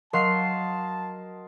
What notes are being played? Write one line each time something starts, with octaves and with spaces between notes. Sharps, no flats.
F#3 A#4 D#5 F5 A5 C6 C7